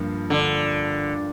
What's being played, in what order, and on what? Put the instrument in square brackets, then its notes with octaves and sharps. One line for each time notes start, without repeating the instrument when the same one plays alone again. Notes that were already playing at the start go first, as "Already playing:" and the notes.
Already playing: [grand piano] G2 F3 A#3
[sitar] D3